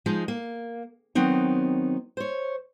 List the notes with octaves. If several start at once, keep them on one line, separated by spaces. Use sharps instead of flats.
F3 G#3 D#4
A#3
D#3 F#3 B3 C4 D#4
C5 C#5